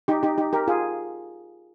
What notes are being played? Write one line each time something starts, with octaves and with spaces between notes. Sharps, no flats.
D#4 G4
D#4 G4
D#4 G4
G4 A#4
F4 G#4